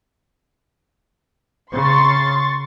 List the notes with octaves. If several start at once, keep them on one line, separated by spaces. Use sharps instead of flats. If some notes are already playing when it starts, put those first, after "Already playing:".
C#3 C6 C#6 A6